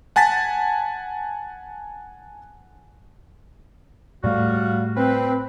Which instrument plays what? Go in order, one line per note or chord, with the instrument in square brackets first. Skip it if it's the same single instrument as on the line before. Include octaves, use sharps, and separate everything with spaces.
[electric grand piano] F#5 G#5 A5 A6 B6
[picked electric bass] A2 A3 [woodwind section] G3 F#4 F5
[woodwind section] C4 B4